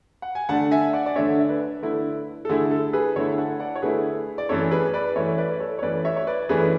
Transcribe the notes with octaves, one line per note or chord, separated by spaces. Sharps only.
F#5
G#5
D3 A3 D4 F#5 A5
E5 G#5
D5 F#5
D5
D3 A3 D4 C#5 E5
E5
B4 D5
D3 A3 E4
A4
D3 A3 E4 G#4
A4
G#4 B4
D3 A3 E4 A4 C#5
F#5 A5
D5 F#5
C#5
D3 A3 E4 G#4 B4
D5
F#2 E3 A3 C#4 A4 C#5
G#4 B4
B4 D5
F#2 E3 A3 C#4 C#5 E5
B4 D5
A4 C#5
C#5
F#2 E3 A3 C#4 B4 D5
C#5 E5
C#5
B4 D5
F#2 E3 A3 C#4 G#4 B4